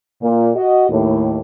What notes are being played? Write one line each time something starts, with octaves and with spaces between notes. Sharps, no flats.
A#2
F#4 D#5
D#2 A2